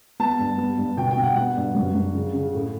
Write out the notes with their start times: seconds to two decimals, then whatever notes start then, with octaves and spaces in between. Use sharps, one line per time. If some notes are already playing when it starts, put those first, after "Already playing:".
0.20 B3 A5
0.39 G2
0.58 B3
0.78 G2
0.97 B2 G5
1.11 G5
1.16 B2
1.23 F#5
1.36 B3 F#5
1.56 G2
1.75 F#2
1.94 F#2
2.14 C#3
2.33 C#3
2.54 A2